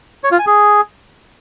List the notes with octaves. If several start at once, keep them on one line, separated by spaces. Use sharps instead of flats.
C#5
F4
G#5
G#4